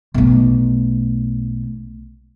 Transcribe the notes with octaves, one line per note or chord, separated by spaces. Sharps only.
B1 A3